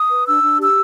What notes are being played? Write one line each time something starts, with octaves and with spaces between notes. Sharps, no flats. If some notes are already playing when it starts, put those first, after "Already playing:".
Already playing: D#6
B4
D4 E6
D4
G4 E6